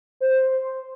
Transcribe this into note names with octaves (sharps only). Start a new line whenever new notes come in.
C5